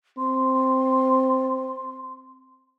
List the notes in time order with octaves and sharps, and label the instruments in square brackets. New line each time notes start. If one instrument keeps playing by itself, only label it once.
[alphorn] C4 [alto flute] C6